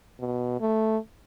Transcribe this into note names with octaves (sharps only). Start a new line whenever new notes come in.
B2
A3